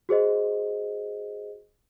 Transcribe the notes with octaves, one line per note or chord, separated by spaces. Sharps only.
F#4 G#4 C5 D#5